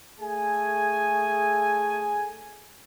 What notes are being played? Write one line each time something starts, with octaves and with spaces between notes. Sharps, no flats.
A3 G#4 G#5